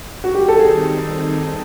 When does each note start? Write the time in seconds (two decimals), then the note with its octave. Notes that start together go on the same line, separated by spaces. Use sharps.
0.24 F#4
0.34 D#3 G3 C4 D#4 G4
0.48 A4
0.59 G#4